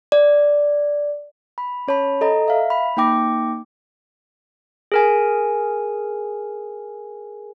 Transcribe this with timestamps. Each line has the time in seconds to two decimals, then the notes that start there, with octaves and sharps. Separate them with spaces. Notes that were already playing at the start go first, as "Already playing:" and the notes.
0.12 D5
1.58 B5
1.88 C#4 C#5 A5 B5
2.21 A4 D#5 A#5
2.48 E5 F5
2.70 B5
2.97 A#3 D#4 G5 D6 A#6
4.92 G#4 A#4 G#5